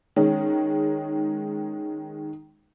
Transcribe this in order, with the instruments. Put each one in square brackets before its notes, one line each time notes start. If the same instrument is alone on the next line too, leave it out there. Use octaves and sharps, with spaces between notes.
[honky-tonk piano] D#3 G#3 C#4